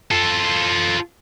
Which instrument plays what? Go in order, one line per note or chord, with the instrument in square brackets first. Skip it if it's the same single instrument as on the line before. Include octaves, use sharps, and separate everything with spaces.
[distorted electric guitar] F4 A4